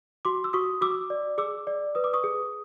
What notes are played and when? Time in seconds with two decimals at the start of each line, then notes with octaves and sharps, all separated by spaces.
0.25 F#4 C6 D6
0.44 E6
0.53 F#4 C#6 D#6
0.81 F#4 D6 E6
1.10 D5
1.38 G#4 D6 E6
1.67 D5
1.95 B4 D#6
2.04 D6
2.14 C#6 D#6
2.24 G#4